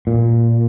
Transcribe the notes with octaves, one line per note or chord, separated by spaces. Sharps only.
A#2